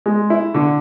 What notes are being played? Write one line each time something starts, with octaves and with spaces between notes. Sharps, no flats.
G#3
E4
D3